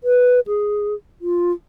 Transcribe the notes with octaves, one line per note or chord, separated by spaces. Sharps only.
B4
G#4
F4